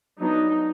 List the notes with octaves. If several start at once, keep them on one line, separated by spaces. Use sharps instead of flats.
F#3 B3 D4 D#4